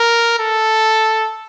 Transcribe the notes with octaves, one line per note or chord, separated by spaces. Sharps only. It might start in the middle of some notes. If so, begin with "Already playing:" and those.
Already playing: A#4
A4